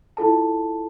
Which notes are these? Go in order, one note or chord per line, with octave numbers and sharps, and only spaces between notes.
E4 F4 A4 A5